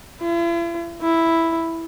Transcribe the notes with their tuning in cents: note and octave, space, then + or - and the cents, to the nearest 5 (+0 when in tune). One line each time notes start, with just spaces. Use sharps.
E4 +45
E4 +0